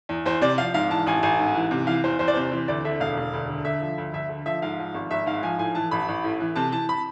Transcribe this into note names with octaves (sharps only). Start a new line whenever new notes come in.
E2
E2 C5
C3 D5
F3 F5
G#2 F5
E3 A5
A1 G#5
A1 G#5
G#2
E3
C3
E3 F5
E2 C5
E2 C5
D5
C3 C5
E3
D2 D5
D3 E5
E1 F5
E1
D2
D3
D3 E5
F3
D2
D2 E5
D3
F3 E5
G#2 F5
F3
G#1
G#1 E5
G#2 F5
F3 G#5
A2 G#5
E3 A5
A1 B5
A1
A2
E3
C3 A5
E3 A5
B5